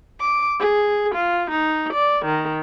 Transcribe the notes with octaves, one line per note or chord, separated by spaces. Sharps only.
D6
G#4
F4
D#4
D5
D#3